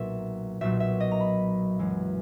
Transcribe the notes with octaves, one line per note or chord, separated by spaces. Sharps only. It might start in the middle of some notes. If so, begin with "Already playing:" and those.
Already playing: B1 A#2 A#3 E5
B1 A#2 F#3 E5
E5
D#5
A#5
B5
F#2 E3 G#3